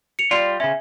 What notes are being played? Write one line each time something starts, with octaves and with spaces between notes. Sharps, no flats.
C#7 F7
G3 F4 D5
C#3 C#4 E5